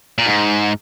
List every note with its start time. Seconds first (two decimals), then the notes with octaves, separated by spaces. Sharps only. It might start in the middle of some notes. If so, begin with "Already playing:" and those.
0.18 A#2
0.26 G#2